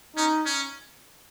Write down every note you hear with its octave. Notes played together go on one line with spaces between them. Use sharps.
C#4 D#4
C#4